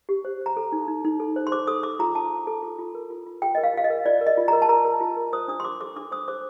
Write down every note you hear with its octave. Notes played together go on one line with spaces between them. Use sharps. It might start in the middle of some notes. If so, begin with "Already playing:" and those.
G4
C5
C5 A#5
A4
D#4
D#4
D#4
A4
C5
C6
C5 D6
A4 D#6
A4 D6
F4 A#5
F4 A5
F4
A4
F4
F4
A#4
F4
F4
F4 G5
A#4 D#5
F5
F4 F5
D#5
A#4
F4 D5
A#4
D#5
F4
A#4 A#5
A5
A#4 A#5
A#4
F4
A#4
C5 D#6
D4 D#6
C6
C5 D6
A4 D6
D4 D6
C5 D#6
C5 D6